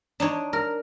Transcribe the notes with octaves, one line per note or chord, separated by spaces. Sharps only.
D4 D#4 C#5
A#4